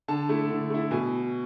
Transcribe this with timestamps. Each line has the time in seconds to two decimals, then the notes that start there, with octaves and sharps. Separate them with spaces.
0.08 D3 A5
0.29 A3 E4
0.50 D3
0.70 A3 E4
0.91 B2 G#5